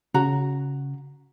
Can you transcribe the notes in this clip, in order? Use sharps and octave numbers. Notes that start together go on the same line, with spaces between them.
C#3 F#4 A#5